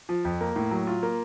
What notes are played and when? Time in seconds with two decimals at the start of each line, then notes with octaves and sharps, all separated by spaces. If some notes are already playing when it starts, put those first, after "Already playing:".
0.09 F3
0.25 F2
0.41 A#3
0.56 A2
0.71 F#3
0.87 F4
1.03 A#3